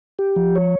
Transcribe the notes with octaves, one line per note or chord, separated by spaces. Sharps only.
G4
F3
C#5